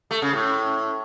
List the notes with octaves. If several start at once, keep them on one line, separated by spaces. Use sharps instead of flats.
A3
C#3
A2